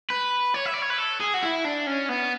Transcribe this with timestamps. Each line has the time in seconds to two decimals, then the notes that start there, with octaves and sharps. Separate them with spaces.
0.10 B4
0.54 C#5
0.65 E5
0.74 D5
0.82 C#5
0.90 B4
0.98 A4
1.20 G#4
1.34 F#4
1.43 E4
1.65 D4
1.87 C#4
2.09 B3